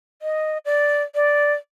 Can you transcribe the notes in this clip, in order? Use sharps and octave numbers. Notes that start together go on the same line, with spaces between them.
D#5
D5
D5